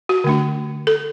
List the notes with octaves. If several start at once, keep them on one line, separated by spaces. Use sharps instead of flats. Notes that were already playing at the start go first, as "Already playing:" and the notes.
F#4
D3 A3 D4
A4